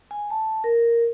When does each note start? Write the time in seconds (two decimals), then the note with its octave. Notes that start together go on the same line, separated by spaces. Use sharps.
0.11 G#5
0.30 A5
0.64 A#4